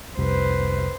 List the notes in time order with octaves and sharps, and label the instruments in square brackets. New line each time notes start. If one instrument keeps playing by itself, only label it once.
[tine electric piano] C2 F2 C3 [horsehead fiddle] B4 C5